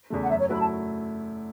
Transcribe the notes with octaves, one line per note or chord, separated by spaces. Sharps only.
E2 C#3 A3
F#5
F#2 E5
C#5
F#3 A3 E4 B4 B5
A5